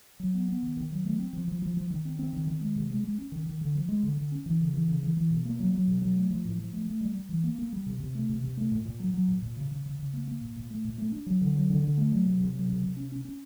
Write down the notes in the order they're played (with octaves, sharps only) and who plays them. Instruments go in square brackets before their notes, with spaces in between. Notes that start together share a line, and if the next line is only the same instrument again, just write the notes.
[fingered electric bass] F#3
B3
B3
D#3
D#3
F#3
A3
C4
F3
F3
F3
F3
D#3
C4
C4
D#3
D#3
G#3
C3
G#3
G#3
C#4
D#3
D#3
D3
F3
G#3
D3
D3
C#4
E3
C#3
E3
C#3
E3
E3
B2
A#3
F#3
F#3
B2
F#3
A3
F3
A2
F3
A3
A3
G3
G3
E3
A#3
A#3
G3
C3
C3
A3
C3
C3
A3
A#2
A#2
F#3
F#3
A#2
A#2
C#3
C#3
C#3
C#3
A#3
A#3
A#2
A#2
A3
A#2
A3
D4
F#3
D3
F#3
D3
D3
A3
F#3
C3
C3
F#3
C3
C3
C#4
C#4
C#4